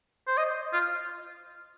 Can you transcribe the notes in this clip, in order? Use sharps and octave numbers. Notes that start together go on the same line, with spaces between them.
C5
D#5
F4